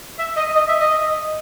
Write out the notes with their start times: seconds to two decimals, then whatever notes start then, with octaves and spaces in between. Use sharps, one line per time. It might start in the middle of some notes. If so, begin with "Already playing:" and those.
0.18 E5
0.37 D#5
0.55 D#5
0.68 E5
0.79 D#5